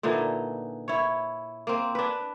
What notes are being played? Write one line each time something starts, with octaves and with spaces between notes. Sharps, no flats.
A#2 D3 E3 D#4
E4 C#5
A#3 C4
D4 B4